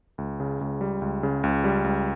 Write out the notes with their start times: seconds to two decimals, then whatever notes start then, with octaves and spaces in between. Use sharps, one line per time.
0.18 C#2
0.40 C#3
0.61 C#2
0.81 G3
1.02 C#2
1.23 C#3
1.44 C#2
1.64 G3
1.84 C#2